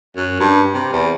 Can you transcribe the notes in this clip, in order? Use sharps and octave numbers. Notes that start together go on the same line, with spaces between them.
F#2
G2
C3
E2